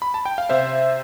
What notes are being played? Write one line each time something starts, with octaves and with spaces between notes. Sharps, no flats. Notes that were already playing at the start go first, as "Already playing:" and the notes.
B5
A5
G5
F5
C3 C5 E5